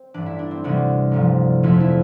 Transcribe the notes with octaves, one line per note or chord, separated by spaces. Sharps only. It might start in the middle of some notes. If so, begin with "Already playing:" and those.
Already playing: C4
A1 G2 E3 D4
E4
D4
C4
D2 C3 E3 G3 D4
A1 G2 F3
G1 F2 D3 F3 E4
E4